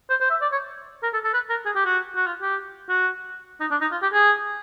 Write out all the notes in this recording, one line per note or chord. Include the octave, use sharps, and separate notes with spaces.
C5
C5
E5
D5
C#5
A#4
A4
A4
B4
A#4
G#4
G4
F#4
F#4
F4
G4
F#4
D#4
D4
D#4
F4
G4
G#4